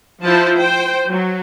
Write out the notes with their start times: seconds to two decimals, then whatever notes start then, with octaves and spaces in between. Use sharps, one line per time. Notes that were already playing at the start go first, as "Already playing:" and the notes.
0.23 F3 E4 C5 A5
0.58 C5 G5
1.08 F#3